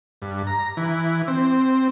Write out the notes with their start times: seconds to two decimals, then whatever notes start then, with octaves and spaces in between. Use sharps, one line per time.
0.22 G2
0.47 A#5
0.77 E3
1.28 C4